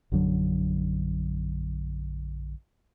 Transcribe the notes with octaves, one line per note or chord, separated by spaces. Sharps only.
A#1 F#2 D3 F#3